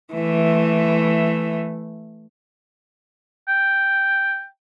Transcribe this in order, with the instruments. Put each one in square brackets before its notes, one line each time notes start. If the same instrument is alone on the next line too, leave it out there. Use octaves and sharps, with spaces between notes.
[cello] E3 A3
[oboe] G5